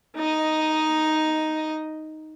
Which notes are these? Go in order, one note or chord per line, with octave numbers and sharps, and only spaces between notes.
D#4 D#5